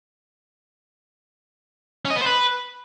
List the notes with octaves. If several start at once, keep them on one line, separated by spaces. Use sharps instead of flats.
C#4
D#5
B3
C5
B4